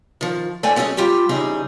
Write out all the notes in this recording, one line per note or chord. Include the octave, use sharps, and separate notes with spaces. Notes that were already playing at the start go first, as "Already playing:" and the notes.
D#3 F3
G#2 A3 A4 D5 G5 G#5
F#3 C#4 G#4 A4 D#5
G3 F4 G4 G5
E2 C#3 G3 D#4 G#4